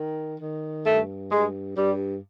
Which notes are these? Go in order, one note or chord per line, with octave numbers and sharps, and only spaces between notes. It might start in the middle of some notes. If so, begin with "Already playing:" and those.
Already playing: D#3
D#3
G2 A3
G2 G#3
G2 G3